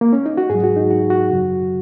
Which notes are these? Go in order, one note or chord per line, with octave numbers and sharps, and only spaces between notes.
A#3
C#4
D#4
F#4
G#2 F#3 G#4
F#4
D#4
F#4
F#4
F#2 C#3 F#3